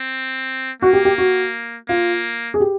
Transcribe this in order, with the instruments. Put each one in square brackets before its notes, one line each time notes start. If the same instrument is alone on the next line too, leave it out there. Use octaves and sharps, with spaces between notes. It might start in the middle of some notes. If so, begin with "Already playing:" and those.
Already playing: [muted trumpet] C4
[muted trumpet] A#3 [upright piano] F#4
[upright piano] G4
G4
F#4
[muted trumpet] A#3 [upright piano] F4
[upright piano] G#4
G4